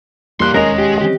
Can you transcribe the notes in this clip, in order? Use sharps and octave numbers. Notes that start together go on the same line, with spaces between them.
E2 G2 G3 A#3 C6 F#6
E1 D#2 G#3 C#4 A#4 D#5 F7
G4
D#3 E3 C4 G4